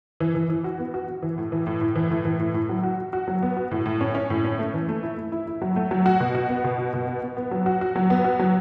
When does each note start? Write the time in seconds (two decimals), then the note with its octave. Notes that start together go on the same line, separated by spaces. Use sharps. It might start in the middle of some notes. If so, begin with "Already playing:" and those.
0.20 E3
0.35 E3
0.50 E3
0.64 F#4
0.79 B3
0.94 F#4
1.08 F#4
1.23 E3
1.38 A2
1.52 E3
1.67 A2
1.81 A2
1.96 E3
2.10 A2
2.25 E3
2.39 A2
2.54 A2
2.69 F#3
2.83 F#4
2.98 F#4
3.13 F#4
3.28 F#3
3.43 B3
3.57 F#4
3.71 A2
3.86 A2
4.01 C#4
4.15 C#4
4.30 A2
4.45 C#4
4.59 A3
4.74 E3
4.89 A3
5.03 E4
5.18 E4
5.32 E4
5.47 E4
5.62 F#3
5.76 A3
5.91 F#3
6.06 F#4
6.20 B2
6.35 F#4
6.49 B3
6.64 B2
6.79 F#4
6.93 B2
7.07 B3
7.22 B3
7.37 B3
7.51 F#3
7.66 F#4
7.81 F#4
7.96 F#3
8.10 B3
8.24 F#4
8.39 F#3